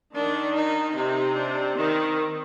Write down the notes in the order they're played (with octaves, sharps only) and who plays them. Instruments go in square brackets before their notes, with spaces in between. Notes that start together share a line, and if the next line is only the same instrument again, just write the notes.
[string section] D#3 [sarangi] D4
[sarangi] D#4
[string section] C3 [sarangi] D#4
[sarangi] D4
[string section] D#3 [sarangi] C4